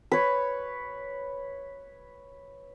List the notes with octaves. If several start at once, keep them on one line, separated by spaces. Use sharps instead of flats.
B4 C#5